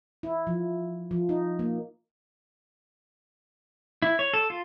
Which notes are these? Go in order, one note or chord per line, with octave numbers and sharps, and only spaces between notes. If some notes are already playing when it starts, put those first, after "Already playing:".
E4
F3
F3
D#4
A#3
E4
C#5
A4
F4